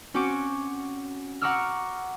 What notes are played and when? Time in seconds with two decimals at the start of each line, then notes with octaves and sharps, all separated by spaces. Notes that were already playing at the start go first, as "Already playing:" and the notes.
0.14 C4 C#4 F#4 C#6 D6
1.41 F#5 A#5 C#6 D6 E6 F6